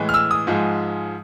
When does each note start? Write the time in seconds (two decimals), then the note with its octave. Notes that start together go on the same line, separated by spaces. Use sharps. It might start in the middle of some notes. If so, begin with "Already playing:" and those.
Already playing: A2 E3 G#3
0.09 F6
0.14 E6
0.31 D#6
0.47 G#2 F3 G#3